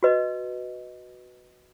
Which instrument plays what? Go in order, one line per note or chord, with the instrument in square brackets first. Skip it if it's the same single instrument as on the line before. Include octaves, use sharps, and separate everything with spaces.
[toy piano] F#4 B4 D#5